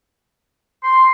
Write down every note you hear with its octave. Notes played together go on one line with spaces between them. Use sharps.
C6